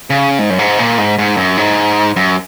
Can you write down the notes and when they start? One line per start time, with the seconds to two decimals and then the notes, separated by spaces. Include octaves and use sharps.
0.10 C#3
0.39 G#2
0.50 F#2
0.59 G#2
0.79 A#2
0.98 G#2
1.18 G#2
1.37 F#2
1.57 G#2
2.16 F#2